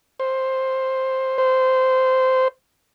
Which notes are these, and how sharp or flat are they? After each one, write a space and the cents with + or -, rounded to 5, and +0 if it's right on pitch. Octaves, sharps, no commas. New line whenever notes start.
C5 +10
C5 -10